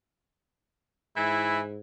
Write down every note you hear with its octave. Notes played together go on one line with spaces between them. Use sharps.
G#2 E3 E4